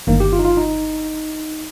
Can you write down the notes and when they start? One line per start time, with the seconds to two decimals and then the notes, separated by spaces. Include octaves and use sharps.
0.07 G1 G2 D#3 A#3
0.20 G4
0.33 F4
0.39 D#4
0.45 F4
0.57 D#4